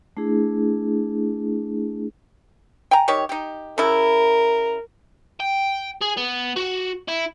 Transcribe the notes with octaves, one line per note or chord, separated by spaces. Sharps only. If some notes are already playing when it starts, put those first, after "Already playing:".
A3 D4 E4 G#4
G5 G#5 A#5
D#3 G4 C#5
D#4 G4
C#3 E4 A#4
G5
G#4
B3
F#4
E4